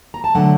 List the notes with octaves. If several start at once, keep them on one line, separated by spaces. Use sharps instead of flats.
A#5
A5
D3 F#3 A3 F#5